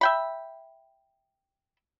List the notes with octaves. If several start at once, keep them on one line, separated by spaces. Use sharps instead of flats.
E5 G5 B5